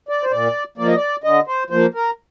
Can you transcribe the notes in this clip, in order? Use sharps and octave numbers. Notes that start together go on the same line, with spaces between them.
D5
C5
A#2 D5
F3 A#3 D5
D#5
D5
D3 D#5
C5
F3 A#3 C5
A#4